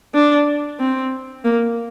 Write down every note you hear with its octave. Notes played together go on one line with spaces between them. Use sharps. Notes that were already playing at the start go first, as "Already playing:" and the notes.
D4
C4
A#3